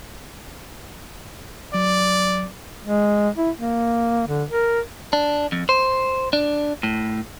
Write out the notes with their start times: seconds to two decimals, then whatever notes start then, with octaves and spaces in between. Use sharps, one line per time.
1.74 F#3 D5
2.85 G#3
3.37 E4
3.59 A#3
4.27 D3
4.50 A#4
5.13 D4
5.52 F2
5.69 C5
6.33 D4
6.83 A2